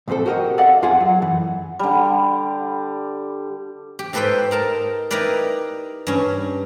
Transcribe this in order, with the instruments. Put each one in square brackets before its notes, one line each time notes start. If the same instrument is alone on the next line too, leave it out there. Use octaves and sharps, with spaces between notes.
[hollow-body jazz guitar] C2 A#2 F3 C4 A4
F#4 G4 A#4 B4 D#5
A4 D5 D#5 F5 F#5
F2 F4 G#4 E5 F#5
F#3
F#2 E3
[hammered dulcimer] D3 G3
[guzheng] G4
G#2 G4 A4 B4 C5 G5
D#4 A#4 A5
D#4 E4 G4 A#4 B4 D5
G2 C#4